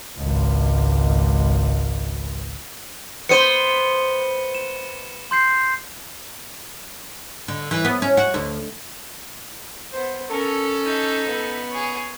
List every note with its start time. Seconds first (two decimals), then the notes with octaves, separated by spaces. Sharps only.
0.18 G#1 C#2
3.29 B3 C5 C#7 D#7 G7
4.55 E7
5.31 C6 G6 C7
7.48 D3
7.71 E3
7.85 B3
8.02 C#4
8.17 F#4
8.34 D2
9.92 B3 C5
10.30 C#4 A4 A#4
10.84 D#4 E5
11.27 B3
11.70 G#4 C#5